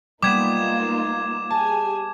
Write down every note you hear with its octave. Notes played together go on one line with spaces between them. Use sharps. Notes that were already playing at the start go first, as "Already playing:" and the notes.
G3 A#3 B3 D#4 F4 D6 G#6 E7
G4 G#4 G#5 A5